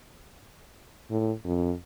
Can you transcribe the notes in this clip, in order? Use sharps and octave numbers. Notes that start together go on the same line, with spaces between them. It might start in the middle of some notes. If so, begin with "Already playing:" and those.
A2
F2